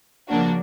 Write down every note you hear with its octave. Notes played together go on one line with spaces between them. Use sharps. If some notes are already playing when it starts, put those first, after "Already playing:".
C#3 F3 A#3 D4 F#4